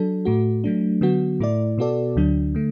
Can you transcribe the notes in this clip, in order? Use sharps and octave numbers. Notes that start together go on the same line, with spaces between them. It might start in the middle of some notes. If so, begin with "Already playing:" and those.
Already playing: F#3 D4 A4
A2 A3 F#4
F#3 A3 D4
D3 F#3 B3 F#4
A2 A3 E4 D5
B2 B3 F#4 A4 D5
D2 D3 F#3 D4
D3 A3